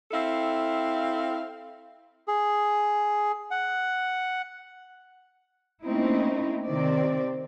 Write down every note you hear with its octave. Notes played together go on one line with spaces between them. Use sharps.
C4 E4 A4 F5
G#4
F#5
A3 A#3 C4 C#4 D#4 E4
C3 D#3 C4 D5